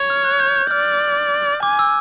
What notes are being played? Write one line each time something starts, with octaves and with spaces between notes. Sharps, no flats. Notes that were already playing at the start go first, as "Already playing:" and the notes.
Already playing: C#5
F6
F#6
G6
G6
D5 F6
G#5 D6
E6